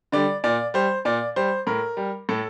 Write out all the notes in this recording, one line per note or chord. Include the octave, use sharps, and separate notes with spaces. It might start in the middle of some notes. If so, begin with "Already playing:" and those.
D3 G3 D5
A#2 D5
G3 C5
A#2 D5
G3 C5
A2 A#4
G3
A2 A4